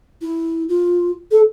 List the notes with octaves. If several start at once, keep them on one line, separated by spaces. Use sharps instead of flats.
E4
F4
A4